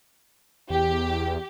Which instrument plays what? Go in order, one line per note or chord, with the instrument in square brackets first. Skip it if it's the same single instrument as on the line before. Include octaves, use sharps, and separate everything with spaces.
[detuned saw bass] E2 [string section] G4